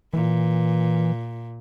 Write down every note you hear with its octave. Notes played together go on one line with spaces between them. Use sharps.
A#2 E3